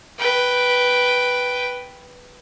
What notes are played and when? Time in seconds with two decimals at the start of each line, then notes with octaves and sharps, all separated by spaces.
0.18 B4 G5